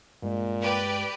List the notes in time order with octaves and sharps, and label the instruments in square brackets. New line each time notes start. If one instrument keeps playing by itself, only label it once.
[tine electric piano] G2 G#3 [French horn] A#2
[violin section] G4 B4 D5